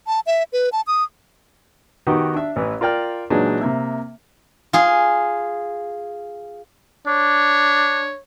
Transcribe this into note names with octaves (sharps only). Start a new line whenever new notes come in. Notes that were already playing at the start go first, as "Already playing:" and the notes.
A5
E5
B4
A5
D#6
D#3 B3 D#4 F#4 G4
D4 E5
A1 E3 B4
F4 A#4 D5 G5 F6
A#2 E3 F#3 G#3 D4 D#4
C3 A#3 E5
F4 G#4
D4 C#5